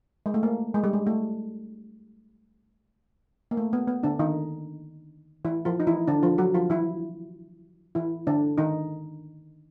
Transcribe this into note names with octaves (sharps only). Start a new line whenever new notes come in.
G#3
A3
A#3
G#3
G3
G#3
A3
A#3
A3
B3
B3
D3 D4
D#3 D#4
E3 E4
F3 F4
D#4
E3 E4
D3 D4
F3 F4
F#3 F#4
F3 F4
E3 E4
E3 E4
D3 D4
D#3 D#4